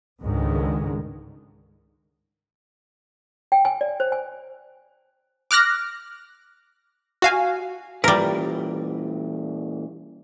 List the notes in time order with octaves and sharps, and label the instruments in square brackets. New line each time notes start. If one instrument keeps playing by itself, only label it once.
[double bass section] C#2 G#2 D3 D#3 G#3
[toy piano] G5
G#5
D5
C5
G#5
[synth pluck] D6 F6 F#6 A#6
F#4 F5 G#5
[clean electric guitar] A#2 E3 B4 [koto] G3 A#4